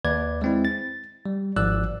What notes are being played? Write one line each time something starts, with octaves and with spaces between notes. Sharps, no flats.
D#2 B4 D5 G#6
G#3 C4 E4
A6
G3
G#1 G#2 F3 D5 E6 F#6